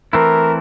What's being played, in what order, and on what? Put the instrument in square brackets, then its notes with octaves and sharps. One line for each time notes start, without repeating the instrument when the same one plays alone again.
[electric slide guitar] E3 A3 C4 E4 [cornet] A#4